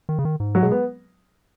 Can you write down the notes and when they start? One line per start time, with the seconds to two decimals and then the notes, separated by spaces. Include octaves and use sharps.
0.09 D#3
0.19 C#3
0.25 D#3
0.40 G#2
0.55 F#3
0.62 B2 G#3
0.71 B3